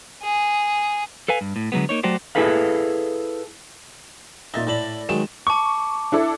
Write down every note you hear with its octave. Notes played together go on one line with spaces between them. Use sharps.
G#4
A4 B4 F5 G#5
G2
A2
D3 F#3 G#3 B3
A#3 D#4 C#5
F#3 A3 F#4 G4 C5 D5
E4 G#4 A4 B4 F5
A#2 D#4 E5 A6 A#6
A2 E4 D5 A5 B5
D#3 F#3 G#3 E7
A5 C#6 D6
D4 E4 A4